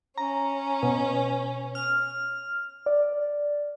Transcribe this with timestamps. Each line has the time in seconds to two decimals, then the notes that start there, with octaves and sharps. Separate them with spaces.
0.18 C#4 A#5
0.83 B2
1.75 F6
2.86 D5